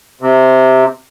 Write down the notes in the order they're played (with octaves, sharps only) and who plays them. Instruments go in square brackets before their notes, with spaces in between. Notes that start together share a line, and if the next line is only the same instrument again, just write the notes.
[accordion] C3